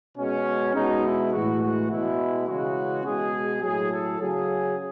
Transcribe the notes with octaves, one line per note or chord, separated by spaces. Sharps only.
B2 G#3 C#4
B2 G#3 D#4
E4
A2 E3 G#3 F#4
F#4
B2 G#3 E4
C#3 E3 G#3 F#4
B2 G#3 G#4
A2 F#3 G#4
A4
C#3 F#3 G#4